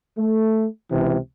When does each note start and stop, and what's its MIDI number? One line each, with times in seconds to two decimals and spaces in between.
0.18 0.66 57
0.92 1.17 37
0.92 1.17 48
0.92 1.17 52